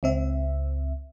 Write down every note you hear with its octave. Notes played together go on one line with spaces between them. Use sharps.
C#2 C4 E5